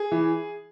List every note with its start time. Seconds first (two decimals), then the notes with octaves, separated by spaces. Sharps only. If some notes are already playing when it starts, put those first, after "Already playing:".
Already playing: G#4
0.12 E3